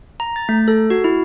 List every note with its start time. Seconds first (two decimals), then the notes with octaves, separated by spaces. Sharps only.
0.20 A#5
0.36 A6
0.49 A3
0.68 A4
0.90 F#4
1.04 E4